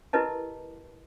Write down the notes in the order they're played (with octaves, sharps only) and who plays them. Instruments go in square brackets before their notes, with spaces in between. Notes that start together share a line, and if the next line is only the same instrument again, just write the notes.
[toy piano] E4 G4 A#4 B4 D#5 A5